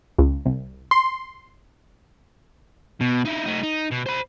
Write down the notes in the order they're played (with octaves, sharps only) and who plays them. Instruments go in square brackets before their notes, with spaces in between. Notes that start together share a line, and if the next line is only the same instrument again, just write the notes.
[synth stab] C#2
C2
C6
[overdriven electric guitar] B2
D#4 E4
A3 D#4
D#4
B2
C5 B5